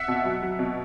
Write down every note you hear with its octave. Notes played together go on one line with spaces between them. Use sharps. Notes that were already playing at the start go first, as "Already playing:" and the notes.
Already playing: E5 F#5
B2
F#3
F#3
B2